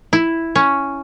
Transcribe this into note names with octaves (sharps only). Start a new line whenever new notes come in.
E4
C#4